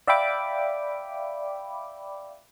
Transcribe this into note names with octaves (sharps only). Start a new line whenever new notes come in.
D5 E5 F5 G5 B5 D6